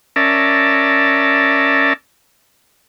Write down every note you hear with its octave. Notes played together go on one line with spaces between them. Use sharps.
C#4 A#4 D5 E5 A5